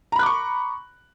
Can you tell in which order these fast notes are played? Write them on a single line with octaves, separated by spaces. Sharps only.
A#5 B5 F#6 D6 C#6